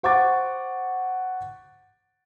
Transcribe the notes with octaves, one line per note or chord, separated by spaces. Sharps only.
C5 F#5 C#6 D6 A6